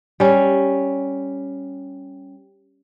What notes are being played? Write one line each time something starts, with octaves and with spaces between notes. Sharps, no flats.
G3 C#4